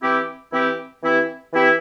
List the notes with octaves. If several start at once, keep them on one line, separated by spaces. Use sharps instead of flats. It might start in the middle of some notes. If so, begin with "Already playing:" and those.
E3 C4 E4 G4
E3 C4 E4 G4
E3 C4 E4 G4
E3 C4 E4 G4